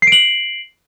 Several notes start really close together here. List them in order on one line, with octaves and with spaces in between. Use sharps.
C7 D7 F#7